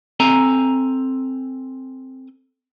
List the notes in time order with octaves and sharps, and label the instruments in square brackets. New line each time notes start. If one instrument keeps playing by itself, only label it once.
[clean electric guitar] C4 A4 G#5 A#5